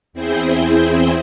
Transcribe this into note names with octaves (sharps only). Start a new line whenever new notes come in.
E2 C4 E4 G#4 C5 G6